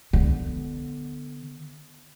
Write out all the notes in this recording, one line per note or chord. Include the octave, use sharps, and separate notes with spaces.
D3 B3